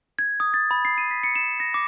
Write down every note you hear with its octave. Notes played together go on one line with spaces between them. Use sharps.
G#6
D#6
A6
B5
C7
D#7
B6
C#7
E7
A#6
D6